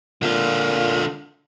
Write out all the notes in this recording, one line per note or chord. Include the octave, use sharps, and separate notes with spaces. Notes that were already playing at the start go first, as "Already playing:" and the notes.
A#2 D3 F4